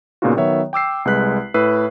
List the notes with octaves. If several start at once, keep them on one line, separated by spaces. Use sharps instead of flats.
A#2 C#3 B3 D#4 F4 F#4
D#3 F#3 B3 C#5 E5
G5 D6 E6 C7
C2 G#3 B4 F#6 B6
A2 B4 E6 C7